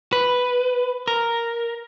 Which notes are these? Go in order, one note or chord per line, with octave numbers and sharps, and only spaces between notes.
B4
A#4